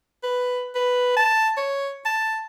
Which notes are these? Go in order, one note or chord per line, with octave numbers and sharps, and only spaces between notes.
B4
B4
A5
C#5
A5